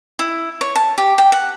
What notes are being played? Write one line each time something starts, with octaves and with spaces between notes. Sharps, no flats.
E4
C#5
A5
G4
G5
F#5